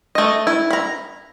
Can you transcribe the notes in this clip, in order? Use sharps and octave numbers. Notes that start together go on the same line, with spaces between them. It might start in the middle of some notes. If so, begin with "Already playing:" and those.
A3 D#5
E4
A#5 B5